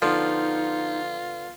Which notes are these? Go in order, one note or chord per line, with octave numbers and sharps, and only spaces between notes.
D3 F3 B3 D#4 F4